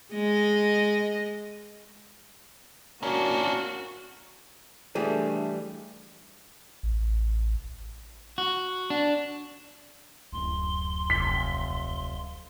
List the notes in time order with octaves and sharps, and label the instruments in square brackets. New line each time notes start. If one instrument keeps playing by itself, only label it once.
[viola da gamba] G#3 D#5
[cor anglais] A#3 [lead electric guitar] C#4 D4 [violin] F#4
[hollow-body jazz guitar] E3 G3 G#4 [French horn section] A3 D4
[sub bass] A1
[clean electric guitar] F#4
D4
[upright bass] D1 F#2 [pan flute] C6
[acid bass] F1 [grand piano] B6